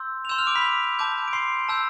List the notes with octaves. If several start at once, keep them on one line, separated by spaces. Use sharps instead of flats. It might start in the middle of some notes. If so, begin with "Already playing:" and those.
Already playing: C6 E6 G6
F7
C6 E6 G6 E7
F6 F7
D6 D7
B5 B6
A5 D6 G6
D7
C6 C7
A5 E6 G6